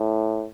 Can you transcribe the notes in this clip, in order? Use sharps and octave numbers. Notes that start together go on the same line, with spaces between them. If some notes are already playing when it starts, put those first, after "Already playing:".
Already playing: A2